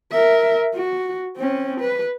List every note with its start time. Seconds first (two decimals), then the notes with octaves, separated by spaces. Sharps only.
0.11 A#4 E5
0.75 F#4
1.37 C4 C#4
1.81 B4